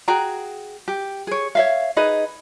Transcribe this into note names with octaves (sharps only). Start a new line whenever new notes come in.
F#4 G#4 G5 A#5
G4
G#4 C#5
C#5 E5 F5
D#4 G#4 B4 D#5